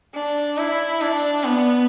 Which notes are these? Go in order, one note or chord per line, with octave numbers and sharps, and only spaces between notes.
D4
E4
D4
B3